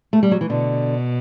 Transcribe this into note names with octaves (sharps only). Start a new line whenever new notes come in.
A3
G3
F#3
E3
B2 D3